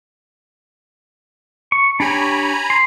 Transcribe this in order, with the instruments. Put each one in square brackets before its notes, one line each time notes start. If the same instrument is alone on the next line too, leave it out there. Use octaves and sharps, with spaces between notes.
[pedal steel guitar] C#6
[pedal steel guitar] D4 G4 C#5 [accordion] G#5 A#5 B5
[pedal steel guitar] C6